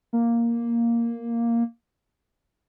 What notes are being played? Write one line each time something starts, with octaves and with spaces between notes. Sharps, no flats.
A#3